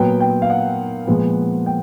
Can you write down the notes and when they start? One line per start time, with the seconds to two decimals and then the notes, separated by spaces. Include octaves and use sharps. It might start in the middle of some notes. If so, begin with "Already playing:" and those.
Already playing: A#2 F#3 B3 G5
0.20 G5
0.42 F5
0.50 F#5
1.07 A#2 F3 G#3 B3
1.66 G5